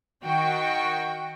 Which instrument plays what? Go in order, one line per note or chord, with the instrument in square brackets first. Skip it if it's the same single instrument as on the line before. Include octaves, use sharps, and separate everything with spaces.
[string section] D#3 F#4 G5